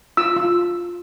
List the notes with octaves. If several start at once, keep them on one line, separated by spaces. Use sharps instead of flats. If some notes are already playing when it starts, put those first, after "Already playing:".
F4 E6
F4